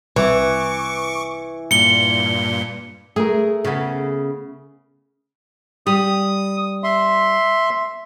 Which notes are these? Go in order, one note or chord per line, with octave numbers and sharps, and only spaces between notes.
C2 E3 C#6 D6
G2 A#2 C#7 G7
A3 G#4 A#4
C#3 B3
G3 D#6
E5 C6